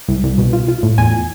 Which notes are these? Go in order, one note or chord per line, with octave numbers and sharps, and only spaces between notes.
C2
C2
B2
F4
F4
A2
E2 G#5